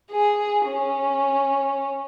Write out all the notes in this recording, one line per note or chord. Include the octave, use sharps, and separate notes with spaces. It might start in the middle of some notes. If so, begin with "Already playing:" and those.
G#4
C#4